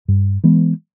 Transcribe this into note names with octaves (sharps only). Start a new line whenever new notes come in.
G2
E3 G#3 B3